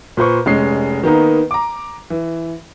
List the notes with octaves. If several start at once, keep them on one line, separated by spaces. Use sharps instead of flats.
A#2 B4 C5 C#6
F1 G#3 C#4 C7
D#3 A#3 B3 D#4
A#5 D6
E3